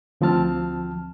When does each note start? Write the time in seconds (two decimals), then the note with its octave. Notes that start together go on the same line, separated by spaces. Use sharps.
0.21 D2 F3 C4 A5 F6